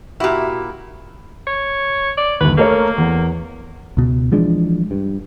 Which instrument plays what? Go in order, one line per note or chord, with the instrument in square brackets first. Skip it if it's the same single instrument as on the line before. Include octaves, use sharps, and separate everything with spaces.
[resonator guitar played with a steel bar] A#2 E4 [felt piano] F#4 G4
[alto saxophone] C#5
D5
[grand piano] G1 D#2 [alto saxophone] B4
[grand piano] A3 A#4 C#5 [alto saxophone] A#3
[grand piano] E2
[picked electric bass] C#2 B2
E3 F3 G#3 D4
G2